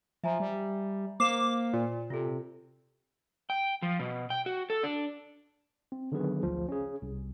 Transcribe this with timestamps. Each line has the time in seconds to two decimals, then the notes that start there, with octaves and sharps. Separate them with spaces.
0.24 F3 E5 G#5 A#5
0.40 G3
1.20 A#3 C5 D6 C7 E7
1.73 A#2
2.10 C3 F4 A4
3.50 G5
3.82 F3
3.99 B2
4.30 G5
4.46 F#4
4.70 A4
4.83 D4
5.92 C4
6.12 D3 D#3 F#3 B3 G#4 B4
6.43 A1 D2 F3
6.69 C#4 G#4
7.02 C2